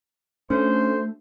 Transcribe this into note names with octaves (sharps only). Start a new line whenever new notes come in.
A3 C#4 D4 F#4 A4 C5